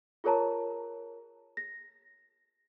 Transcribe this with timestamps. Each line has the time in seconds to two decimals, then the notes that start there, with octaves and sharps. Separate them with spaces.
0.24 F4 G#4 A#4 C#5 A5 A#5
1.57 A#6